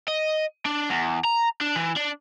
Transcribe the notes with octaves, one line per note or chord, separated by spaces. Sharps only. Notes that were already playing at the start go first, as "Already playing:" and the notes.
D#5
D4
E2
A#5
D4
E3
D4